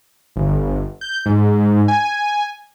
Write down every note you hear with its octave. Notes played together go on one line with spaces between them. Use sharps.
G1
G6
G#2
G#5